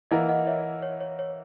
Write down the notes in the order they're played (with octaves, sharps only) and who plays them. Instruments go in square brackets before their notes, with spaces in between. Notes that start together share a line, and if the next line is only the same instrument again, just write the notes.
[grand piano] E3 A#3 E4 A#4 [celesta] D#5 F#5
[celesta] D#5 F#5
C#5 E5
C#5
C#5
C#5